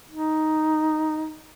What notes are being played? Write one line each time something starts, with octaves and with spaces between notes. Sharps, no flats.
D#4